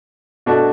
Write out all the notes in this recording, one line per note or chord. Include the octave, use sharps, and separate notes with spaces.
B2 A3 D4 F#4